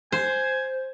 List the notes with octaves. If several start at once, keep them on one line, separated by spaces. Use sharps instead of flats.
C5 G#5